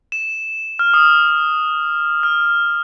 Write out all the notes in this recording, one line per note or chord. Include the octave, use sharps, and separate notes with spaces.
E7
F6
D#6
F6